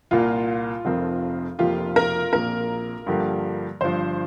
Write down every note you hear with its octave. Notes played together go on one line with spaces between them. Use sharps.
C2 A#2 A#3 F4
F1 F2 F3 C4 A#4
F1 F2 F3 A#3 F4 G4
A#4
A#1 A#2 A#3 A#4
G2 D3 F3 A#3 G4
G1 G2 F3 C5